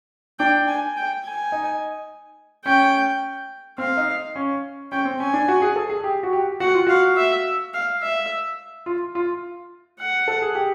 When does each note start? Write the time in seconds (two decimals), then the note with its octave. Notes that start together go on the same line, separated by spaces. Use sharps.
0.39 D4 G5
0.68 G#5
0.97 G5
1.25 G#5
1.52 D#4
2.65 C#4 G5
3.78 C4 F5
3.97 D#4
4.36 C#4
4.92 C#4 G5
5.05 C4
5.20 C#4 G#5
5.34 D4
5.48 F#4
5.62 G#4
5.76 A4
5.90 G#4
6.04 G4
6.23 F#4
6.33 G4
6.60 F#4 F#5
6.74 F4
6.87 F#4 F5
7.17 E5
7.74 F5
8.02 E5
8.86 F4
9.15 F4
10.00 F#5
10.28 A4
10.42 G#4
10.55 G4